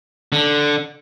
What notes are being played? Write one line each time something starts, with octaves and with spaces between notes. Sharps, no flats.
D3